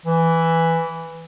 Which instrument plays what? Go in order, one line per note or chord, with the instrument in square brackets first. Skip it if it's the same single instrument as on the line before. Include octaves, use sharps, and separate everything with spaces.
[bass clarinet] E3